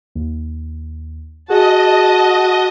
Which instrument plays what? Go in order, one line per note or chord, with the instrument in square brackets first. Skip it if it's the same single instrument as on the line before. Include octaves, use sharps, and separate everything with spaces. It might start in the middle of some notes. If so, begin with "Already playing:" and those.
[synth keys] D#2
[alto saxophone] F#4 [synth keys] G#4 [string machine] D#5 [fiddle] A5